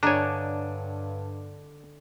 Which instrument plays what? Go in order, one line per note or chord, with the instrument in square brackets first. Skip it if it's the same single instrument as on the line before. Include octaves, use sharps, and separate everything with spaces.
[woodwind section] G2 [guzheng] D3 D#5 [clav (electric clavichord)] D4 G#5 [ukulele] C#5 A#5